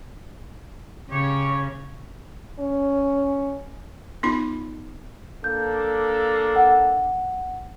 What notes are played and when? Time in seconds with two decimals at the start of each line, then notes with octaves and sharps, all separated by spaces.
1.11 C#3 G4 C#5
2.59 C#4
4.23 B3 D#4 F4 B5
5.44 A#3 D4 A4 G6
6.56 F#5